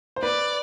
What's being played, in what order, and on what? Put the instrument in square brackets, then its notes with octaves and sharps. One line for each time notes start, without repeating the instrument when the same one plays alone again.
[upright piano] C5
[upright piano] B4 [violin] D5